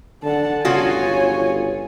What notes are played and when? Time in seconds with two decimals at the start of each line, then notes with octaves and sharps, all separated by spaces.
0.23 D3 F#5 A5
0.65 G1 C#3 F4 F#4 C#5 G#5